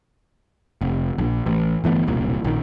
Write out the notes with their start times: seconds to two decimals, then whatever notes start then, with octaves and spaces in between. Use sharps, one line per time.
0.81 F1
1.18 A#1
1.46 A1
1.84 G1 E3 A3 B3
2.07 E1 C2 A#2
2.44 A#1 D#3